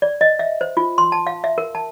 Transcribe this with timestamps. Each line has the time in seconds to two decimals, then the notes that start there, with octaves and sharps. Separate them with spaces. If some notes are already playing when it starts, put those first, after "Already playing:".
0.02 D5
0.21 D#5
0.39 E5
0.61 C5
0.77 F4
0.98 C6
1.12 A5
1.27 F5
1.44 E5
1.58 A#4
1.75 A5